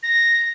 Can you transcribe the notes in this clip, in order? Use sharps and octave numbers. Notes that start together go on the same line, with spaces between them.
A#6